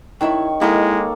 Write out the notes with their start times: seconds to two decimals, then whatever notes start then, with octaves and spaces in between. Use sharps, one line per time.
0.21 D#3 D4 E4 C#5 E5
0.61 G#3 A#3 E4 A4 D#5